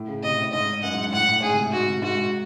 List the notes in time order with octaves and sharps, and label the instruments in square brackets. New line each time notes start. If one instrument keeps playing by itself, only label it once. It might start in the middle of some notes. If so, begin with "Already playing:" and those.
Already playing: [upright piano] A2
C#3
[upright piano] C3 [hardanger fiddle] D#5
[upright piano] A2
[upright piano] G#2 [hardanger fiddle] D#5
[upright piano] F#2 [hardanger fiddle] F#5
[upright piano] G#2
G#2
[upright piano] A2 [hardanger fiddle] F#5
[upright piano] A2
[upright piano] G#2 [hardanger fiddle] G#4
[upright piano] C3
[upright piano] G#2 [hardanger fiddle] F#4
[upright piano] C3
[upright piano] G#2 [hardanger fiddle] F#4
[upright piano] G#2